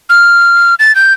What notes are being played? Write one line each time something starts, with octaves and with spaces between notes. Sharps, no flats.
F6
A6
G6